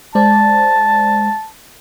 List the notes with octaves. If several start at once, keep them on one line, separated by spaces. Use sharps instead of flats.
G#3 C5 D5 A5